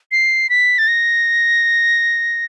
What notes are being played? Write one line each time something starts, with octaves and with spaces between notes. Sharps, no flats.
C7
B6
A6
A#6